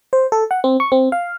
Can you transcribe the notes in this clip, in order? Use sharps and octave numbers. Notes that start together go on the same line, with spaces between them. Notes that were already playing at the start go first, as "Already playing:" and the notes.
C5
A4
F#5
C4
C#6
C4
F5